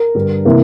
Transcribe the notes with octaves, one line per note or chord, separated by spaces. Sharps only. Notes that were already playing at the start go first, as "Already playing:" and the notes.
Already playing: A#4
G2 D3 G3
C3 E3 A#3 E4